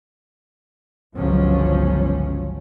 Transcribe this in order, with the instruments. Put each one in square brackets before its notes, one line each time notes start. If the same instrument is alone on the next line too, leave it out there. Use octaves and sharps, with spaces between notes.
[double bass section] G1 C#2 F3 F#3 C#4